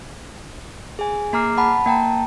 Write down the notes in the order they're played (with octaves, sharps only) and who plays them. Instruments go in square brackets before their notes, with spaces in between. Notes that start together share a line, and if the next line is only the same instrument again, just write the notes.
[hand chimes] G#4 G#5
A#3 G#4 A#5 D6 F6 C7
F#5 A5 B5
A#3 G5 A5 A#5